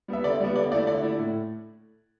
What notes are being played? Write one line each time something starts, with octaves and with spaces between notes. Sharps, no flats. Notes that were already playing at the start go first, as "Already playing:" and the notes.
G3 B3 E5
D3 D5
G3 B3
D3 D5
A3 E4 D5
D3 D5
A3 E4
A2